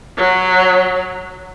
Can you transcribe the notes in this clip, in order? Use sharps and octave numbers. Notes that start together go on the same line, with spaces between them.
F#3